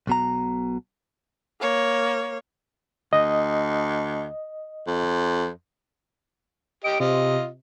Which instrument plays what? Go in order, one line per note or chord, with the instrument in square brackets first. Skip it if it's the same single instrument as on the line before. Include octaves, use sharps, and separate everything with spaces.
[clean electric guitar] B1 B2 A#5
[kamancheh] A#3 C#5
[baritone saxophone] D2 [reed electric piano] D#5
[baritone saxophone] F2
[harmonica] G4 D#5 [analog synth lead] D7
[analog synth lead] C3 [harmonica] F4 D#5